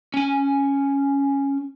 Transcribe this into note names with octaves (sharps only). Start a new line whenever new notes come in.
C#4 G#5